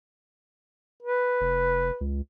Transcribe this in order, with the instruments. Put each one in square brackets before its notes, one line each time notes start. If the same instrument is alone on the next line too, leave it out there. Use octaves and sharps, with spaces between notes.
[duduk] B4
[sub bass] F1
C#2